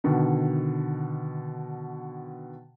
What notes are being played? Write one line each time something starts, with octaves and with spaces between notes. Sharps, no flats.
B2 D3 D#3